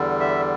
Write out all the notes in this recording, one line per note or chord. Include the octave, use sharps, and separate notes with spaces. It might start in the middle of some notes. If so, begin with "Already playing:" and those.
Already playing: E2 D3 G3
E5